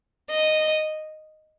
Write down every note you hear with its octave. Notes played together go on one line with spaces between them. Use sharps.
D#5